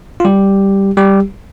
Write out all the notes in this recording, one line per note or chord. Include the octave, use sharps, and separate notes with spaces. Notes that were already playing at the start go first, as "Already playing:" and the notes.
F4
G3 G4
G3 G4